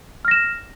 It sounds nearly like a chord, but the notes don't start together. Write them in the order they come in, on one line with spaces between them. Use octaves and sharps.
F6 A#6 E7